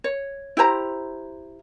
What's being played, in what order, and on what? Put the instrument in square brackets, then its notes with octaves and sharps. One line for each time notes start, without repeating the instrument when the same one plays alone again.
[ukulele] C#5
E4 G4 C5 A#5